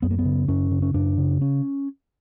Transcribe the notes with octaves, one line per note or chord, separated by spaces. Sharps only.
F#2 B3
A#3
B3
C#3
F#2 C#4
C#3
C#4
F#2 D4
C#3
C#4